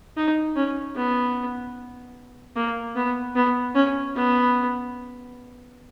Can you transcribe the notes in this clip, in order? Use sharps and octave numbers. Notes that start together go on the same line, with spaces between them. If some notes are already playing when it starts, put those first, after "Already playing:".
D#4
C#4
B3
A#3
B3
B3
C#4
B3